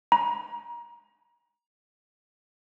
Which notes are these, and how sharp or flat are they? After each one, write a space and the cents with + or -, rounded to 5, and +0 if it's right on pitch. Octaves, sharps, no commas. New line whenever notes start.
A#5 +30